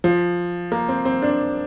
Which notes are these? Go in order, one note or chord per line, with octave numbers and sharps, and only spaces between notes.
F3
A#3
C4
C4
D4